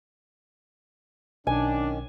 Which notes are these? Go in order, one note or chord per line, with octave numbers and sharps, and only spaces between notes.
B1 D#3 C#4 D4 G#5